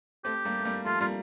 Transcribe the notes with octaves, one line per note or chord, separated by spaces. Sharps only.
A3 C4 G4
G3 A#3
A3
G3 A#3
F3 A3 F4
G3 A#3 F4